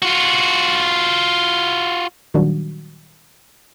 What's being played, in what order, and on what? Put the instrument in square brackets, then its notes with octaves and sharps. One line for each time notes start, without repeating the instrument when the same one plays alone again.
[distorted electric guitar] F4 F#4
[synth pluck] A#2 D#3 F#3 G3 D4 F#4